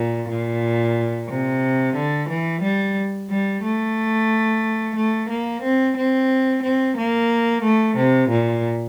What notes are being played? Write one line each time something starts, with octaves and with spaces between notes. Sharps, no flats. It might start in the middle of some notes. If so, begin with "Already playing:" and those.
Already playing: A#2
A#2
C3
D3
E3
G3
G3
A3
A3
A#3
C4
C4
C4
A#3
A3
C3
A#2